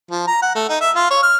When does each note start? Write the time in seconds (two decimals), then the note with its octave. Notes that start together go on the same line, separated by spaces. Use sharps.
0.11 F3
0.27 A#5
0.42 F#5
0.55 A3
0.69 D#4
0.81 E5
0.95 F4
1.10 C#5
1.23 F6